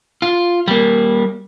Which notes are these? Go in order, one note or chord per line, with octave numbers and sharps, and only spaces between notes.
F4
G3 A#3